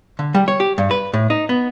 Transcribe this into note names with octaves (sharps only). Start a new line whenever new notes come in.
D3
G3
C#5
G4
G2
B4
A2
D#4
B3